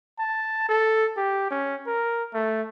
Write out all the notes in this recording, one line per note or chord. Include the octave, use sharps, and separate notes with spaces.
A5
A4
G4
C#4
A#4
A3